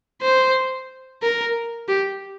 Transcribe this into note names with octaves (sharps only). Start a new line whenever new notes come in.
C5
A#4
G4